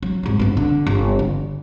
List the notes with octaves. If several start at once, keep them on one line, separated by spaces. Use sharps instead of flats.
F#3
G#1 F2
G1 B3
D3
G1
D3